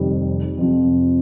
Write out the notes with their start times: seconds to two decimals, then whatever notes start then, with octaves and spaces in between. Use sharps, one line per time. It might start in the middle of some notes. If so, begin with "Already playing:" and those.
Already playing: F1 F2 D#3 G3
0.58 F2 C3 F3